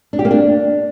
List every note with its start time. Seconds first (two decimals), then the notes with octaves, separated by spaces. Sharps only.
0.13 D4
0.19 G4
0.25 A#3
0.31 D4